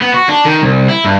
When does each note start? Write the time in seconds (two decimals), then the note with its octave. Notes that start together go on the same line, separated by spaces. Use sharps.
0.01 B3
0.14 F#4
0.29 D4
0.45 D#3
0.62 C2
0.89 E4
1.04 G2